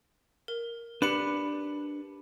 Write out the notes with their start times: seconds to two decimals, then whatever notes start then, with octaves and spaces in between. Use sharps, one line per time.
0.48 A#4
1.02 D4 G4 B4 B5 C#7